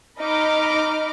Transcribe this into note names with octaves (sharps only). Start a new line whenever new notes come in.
D#4 D#5 A#5 B5 D6 F6